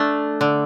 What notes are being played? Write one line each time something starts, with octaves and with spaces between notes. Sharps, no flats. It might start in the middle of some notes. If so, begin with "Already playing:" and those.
Already playing: A3 D4
D3